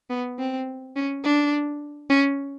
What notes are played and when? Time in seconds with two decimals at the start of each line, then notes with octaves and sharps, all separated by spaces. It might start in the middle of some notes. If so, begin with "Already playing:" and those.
0.10 B3
0.39 C4
0.96 C#4
1.24 D4
2.10 C#4